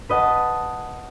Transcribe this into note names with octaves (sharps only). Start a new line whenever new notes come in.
B4 D#5 F#5 A5